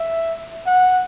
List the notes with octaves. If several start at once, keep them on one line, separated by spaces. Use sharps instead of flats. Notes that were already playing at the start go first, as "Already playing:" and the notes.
Already playing: E5
F#5